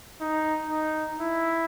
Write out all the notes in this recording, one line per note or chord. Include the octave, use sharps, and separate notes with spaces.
D#4
D#4
E4